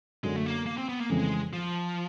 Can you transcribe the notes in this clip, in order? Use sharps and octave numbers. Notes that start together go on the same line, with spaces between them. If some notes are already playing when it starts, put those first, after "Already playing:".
F#2 D3 F#3 G#3
A3
A#3
A#3
C4
B3
A#3
F2 C#3 E3 G#3 A3 C4
F3